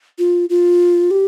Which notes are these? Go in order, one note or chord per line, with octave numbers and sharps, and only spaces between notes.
F4
F4
G4